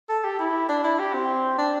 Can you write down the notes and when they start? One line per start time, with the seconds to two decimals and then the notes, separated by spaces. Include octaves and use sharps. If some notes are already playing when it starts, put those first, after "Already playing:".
0.09 A4
0.24 G4
0.39 E4
0.69 D4
0.84 E4
0.99 G4
1.14 C4
1.58 D4